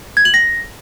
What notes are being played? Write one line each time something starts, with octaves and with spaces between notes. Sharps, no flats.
G#6
F#7
A#6